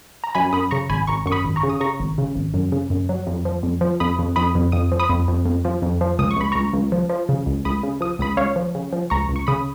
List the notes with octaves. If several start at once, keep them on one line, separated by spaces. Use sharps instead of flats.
A#5
F#2 G#5 B5
F#2 B5 D#6
C#3 A#5 C#6
G#1 G#5 B5
G#1 A#5 C#6
F#2 C#6
B5 D#6
G#1
A#5 C#6
C#3
D#6
C#3 A#5 C#6
G#1
C#3
G#1
F#2
C#3
F#2
F#3
F2
F3
F2
F3
F2 B5 D#6
F2
F2 B5 D#6
F2
F2 D#6
F3
B5 D#6
F2
F2
F2
F3
F2
F3
C#2 D#6
C#6
C#2 B5
C#2 A#5 C#6
C#2
F3
F3
C#3
C#2
C#2 B5 D#6
C#3
F3 D#6
C#2 B5 D#6
C#2 C#5 F5
F3
C#3
F3
C#2 A#5 C#6
C#2
C#6
C#3 B5 D#6